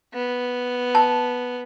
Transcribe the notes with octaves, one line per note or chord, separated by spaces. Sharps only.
B3
A5